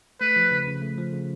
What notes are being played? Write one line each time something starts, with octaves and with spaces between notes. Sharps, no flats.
A3 B4
F3
C#3
C#3
A3
F3
C#3